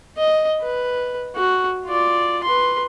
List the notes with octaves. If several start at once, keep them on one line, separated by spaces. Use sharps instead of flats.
D#5
B4
F#4
F4 D5
B4 C6